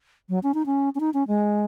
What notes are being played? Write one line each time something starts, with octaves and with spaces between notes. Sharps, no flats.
F#3
C#4
D#4
C#4
C#4
D#4
C#4
G#3